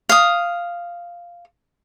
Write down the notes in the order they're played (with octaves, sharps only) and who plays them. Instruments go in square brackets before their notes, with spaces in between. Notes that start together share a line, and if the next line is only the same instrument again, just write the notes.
[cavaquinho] F5 D#6